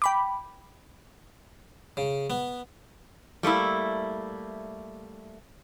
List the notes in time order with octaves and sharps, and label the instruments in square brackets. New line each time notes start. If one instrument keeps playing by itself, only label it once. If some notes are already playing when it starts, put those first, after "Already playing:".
[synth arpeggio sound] G5 B5 D6
[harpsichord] C#3
B3
[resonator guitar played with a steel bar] G3 A3 A#3 E4